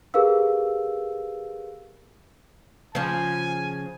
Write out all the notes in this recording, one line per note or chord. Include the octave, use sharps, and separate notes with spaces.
G4 G#4 A#4 B4 F5 E6
C#3 F3 G#5